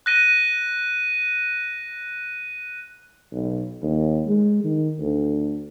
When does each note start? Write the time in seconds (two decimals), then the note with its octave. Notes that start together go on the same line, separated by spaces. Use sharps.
0.06 F#6 A#6 D#7
3.33 B1
3.83 D#2
4.27 G#3
4.64 D#3
4.99 D2